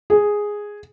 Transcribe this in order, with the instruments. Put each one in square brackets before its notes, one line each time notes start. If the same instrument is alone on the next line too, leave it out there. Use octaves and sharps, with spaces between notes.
[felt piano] G#4